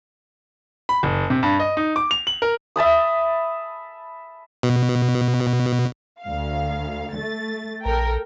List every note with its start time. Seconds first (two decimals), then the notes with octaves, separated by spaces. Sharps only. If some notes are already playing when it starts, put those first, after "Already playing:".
0.89 B5
1.03 F#1
1.30 C3
1.43 G2
1.60 D#5
1.77 D#4
1.96 D6
2.11 F7
2.27 F#7
2.42 A#4
2.76 E5 A5 B5 D#6
4.63 B2
6.22 D2 F5
7.16 A3 A6
7.85 A#1 A4 A#4 G5